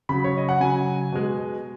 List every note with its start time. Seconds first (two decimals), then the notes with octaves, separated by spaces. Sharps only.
0.09 C#3 F#3 B5
0.24 C#5
0.37 D#5
0.49 F#5
0.60 C#3 F#3 G#5
1.12 B2 G#3